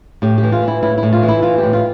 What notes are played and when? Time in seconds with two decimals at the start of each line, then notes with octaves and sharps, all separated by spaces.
0.22 A2 G4
0.38 G4
0.43 E3
0.52 F4
0.63 E3 E4
0.83 A2 E4
0.98 E4
1.03 A2
1.13 F4
1.23 E3
1.28 E4
1.43 E3 F4
1.58 G4
1.63 A2
1.73 F4